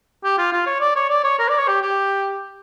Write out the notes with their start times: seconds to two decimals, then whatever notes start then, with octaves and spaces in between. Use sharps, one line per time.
0.24 G4
0.38 F4
0.52 F4
0.67 C#5
0.81 D5
0.96 C#5
1.10 D5
1.24 C#5
1.39 A#4
1.49 D5
1.58 C#5
1.68 G4
1.82 G4